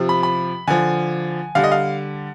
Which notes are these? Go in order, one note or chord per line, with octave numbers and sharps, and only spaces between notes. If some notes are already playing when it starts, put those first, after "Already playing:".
Already playing: C3 F3
B5
B5
D3 F3 G#5
D3 G3 F5
D#5
F5